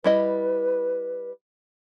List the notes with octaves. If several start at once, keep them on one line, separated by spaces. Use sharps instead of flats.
G3 E4 B4 D#5